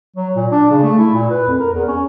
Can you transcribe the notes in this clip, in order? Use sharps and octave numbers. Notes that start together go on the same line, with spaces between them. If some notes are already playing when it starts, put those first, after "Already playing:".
F#3
A#2
D4
C#3
A3
E4
A#2
B4
F2
A#4
E2
C#4